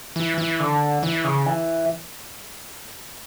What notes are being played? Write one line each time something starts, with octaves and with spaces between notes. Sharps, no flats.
E3
E3
D3
E3
C#3
E3